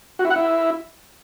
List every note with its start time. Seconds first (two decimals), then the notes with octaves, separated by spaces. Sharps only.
0.19 F#4
0.25 E4
0.30 F#5
0.36 E4